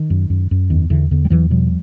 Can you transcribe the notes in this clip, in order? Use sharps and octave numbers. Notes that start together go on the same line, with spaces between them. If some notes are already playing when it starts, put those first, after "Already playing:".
Already playing: D#3
F#2
F#2
F#2
E2 D#3
E2 D3 E3
E2 D3
G3
E2 E3 F#3
B2 F3 G3